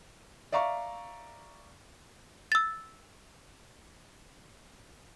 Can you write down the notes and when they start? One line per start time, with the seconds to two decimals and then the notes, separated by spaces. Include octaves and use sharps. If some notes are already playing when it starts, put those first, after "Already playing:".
0.52 D5 E5 F5 A#5 C#6
2.52 E6 A6